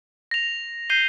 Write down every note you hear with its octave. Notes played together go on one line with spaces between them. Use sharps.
A#6 F7
G6 C7 D#7 G7